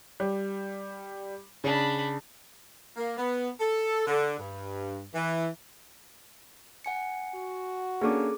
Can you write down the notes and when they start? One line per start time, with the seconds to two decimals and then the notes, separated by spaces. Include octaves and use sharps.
0.20 G3
1.64 C#3 D4 B5
2.97 A#3
3.17 B3
3.59 A4
4.06 D3
4.38 G2
5.14 E3
6.85 F#5 G#5 C#7
7.35 F#4
8.01 A#3 C#4 D4 G#4 A4 D6